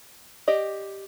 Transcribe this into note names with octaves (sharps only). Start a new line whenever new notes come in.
G4 D5 D#5